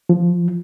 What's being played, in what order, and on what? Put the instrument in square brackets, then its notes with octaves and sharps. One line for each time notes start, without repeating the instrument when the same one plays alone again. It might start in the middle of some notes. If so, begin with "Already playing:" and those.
[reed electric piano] F3